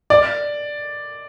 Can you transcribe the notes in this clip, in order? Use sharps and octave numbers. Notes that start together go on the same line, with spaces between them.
D5